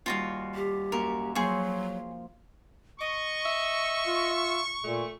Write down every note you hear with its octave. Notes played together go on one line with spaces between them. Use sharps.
D#2 G3 F4 F#4 F5
G4
F#2 A#3 A#4 C#6
F3 F#3 A#3 G#4 C6 C#6
D#5 C#6
E5
F4
A#2 A3